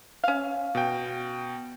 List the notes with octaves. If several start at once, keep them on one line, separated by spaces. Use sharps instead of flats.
C#4 F5
B2 G5